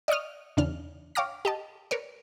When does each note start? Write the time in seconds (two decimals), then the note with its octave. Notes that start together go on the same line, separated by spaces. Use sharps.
0.08 D5 D#5 C#6 D#6 F6
0.57 E2 C#3 D4 F6
1.15 C#5 F5 G5 D6 F6 A#6
1.45 G4 D#5 A5
1.91 A#4 B4 C#5 D5